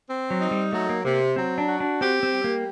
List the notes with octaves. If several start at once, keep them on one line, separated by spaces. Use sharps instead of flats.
C4
F#3
D#4
G3
F#3 A3
A#3
C3 A#3
F#3 C4
D4
F#4
D4
C4 G4
C4
G3
A#3